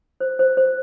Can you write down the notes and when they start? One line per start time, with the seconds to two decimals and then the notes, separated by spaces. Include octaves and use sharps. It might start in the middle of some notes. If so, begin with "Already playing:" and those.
0.20 C5
0.39 C5
0.57 C5